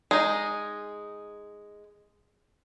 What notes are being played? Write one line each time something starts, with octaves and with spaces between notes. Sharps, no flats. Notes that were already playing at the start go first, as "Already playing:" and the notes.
G#3 D#4